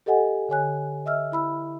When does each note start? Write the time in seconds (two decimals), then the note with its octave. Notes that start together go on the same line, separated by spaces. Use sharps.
0.06 G4 A4 D#5 F#5 G#5
0.49 D3 C#5 G#5 F#6
1.06 D#5 E5 E6 F6
1.32 E4 B5 E6